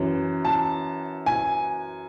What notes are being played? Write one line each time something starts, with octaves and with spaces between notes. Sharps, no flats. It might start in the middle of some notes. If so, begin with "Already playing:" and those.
Already playing: F#2 E3
A5
G#5